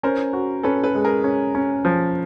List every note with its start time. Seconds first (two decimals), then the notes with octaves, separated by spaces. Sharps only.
0.03 C#4 A#4 C5
0.33 F#4
0.63 C#4 A4 B4
0.84 A4 B4
0.95 G#3
1.05 G#4 A#4
1.24 C#4
1.55 C#4
1.85 F3